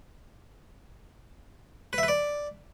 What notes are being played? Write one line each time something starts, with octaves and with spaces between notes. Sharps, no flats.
B4
E5
B4
D5